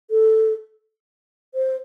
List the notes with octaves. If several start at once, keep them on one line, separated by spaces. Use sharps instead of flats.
A4
C5